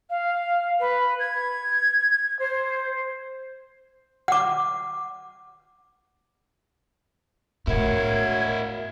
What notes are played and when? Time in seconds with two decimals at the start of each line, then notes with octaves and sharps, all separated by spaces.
0.10 F5
0.80 B4
1.19 G#6
2.39 C5
4.28 F#5 D6
7.67 A2 E4 F#4 A#4 C#5 G#6